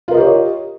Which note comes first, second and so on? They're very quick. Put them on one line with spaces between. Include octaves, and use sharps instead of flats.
F4 A#4 D#5 G4 C#5